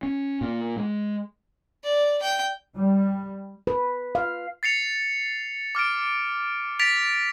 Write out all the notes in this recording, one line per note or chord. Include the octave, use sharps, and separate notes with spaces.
C#4
A#2
G#3
D5
G5
G3
B4
F5
A6 C7 C#7 F7
D6 F6 A6 D7
A6 B6 D7 F7